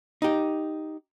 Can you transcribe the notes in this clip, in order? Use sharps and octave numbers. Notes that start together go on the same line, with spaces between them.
D#4 G4